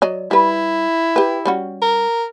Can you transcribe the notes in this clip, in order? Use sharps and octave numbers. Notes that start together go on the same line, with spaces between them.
F#3 D5 D#5
G3 E4 B4
G4 B4
G3 C#4 F#4
A#4